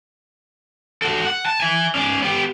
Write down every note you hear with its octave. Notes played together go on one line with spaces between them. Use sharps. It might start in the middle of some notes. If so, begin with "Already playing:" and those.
F#4 A4
F#5
A5
E5 G#5
C#4 D5
B3 G4